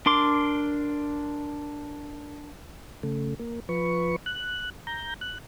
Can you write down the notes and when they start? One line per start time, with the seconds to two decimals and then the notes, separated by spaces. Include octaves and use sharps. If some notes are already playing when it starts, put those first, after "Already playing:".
0.06 D4 A#4 C6 D6
3.03 C#3 A3
3.39 A#3
3.69 F3 B4 C#6
4.26 F#6
4.87 A#5 G6
5.21 F#6